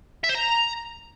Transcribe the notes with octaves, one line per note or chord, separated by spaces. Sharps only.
E5
C5
A#5